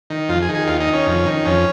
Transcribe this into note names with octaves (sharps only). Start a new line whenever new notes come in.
D#3
F2 F4
G#4
D#3
G#4
D#2 F4
D#4
D#3
C#4
F2
D#3
F2 C#4